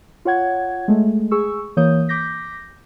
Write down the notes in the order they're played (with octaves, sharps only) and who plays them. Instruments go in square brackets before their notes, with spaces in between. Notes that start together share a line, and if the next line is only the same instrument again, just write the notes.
[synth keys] F4 C#5 F#5 G#6
G#3 A3
G#4 C#6 E6
E3 A#3 C#5 D#6 G6
D6 G6 A#6 B6